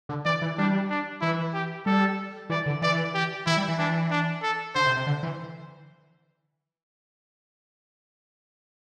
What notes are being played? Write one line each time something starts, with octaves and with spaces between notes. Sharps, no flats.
D3
E3 D5
E3
G3 D4
D4
E3 E4
G4
G3 A4
E3 D5
D3
E3 D5
G4
E3 E4
G3
E3
E3 D4
D4
A4
D3 C5
C3
C3
D3
E3